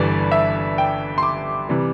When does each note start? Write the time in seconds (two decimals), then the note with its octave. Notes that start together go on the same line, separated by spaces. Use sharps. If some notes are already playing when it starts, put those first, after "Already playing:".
Already playing: G1 G2 E3 G3 D5
0.32 E5
0.78 G5
1.18 C6
1.23 D6
1.69 C3 E3 G3